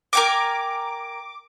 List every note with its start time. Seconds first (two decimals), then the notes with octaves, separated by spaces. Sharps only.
0.13 A#4 G5 G#5 D6